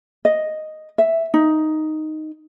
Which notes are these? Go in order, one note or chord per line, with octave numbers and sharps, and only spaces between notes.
D#5
E5
D#4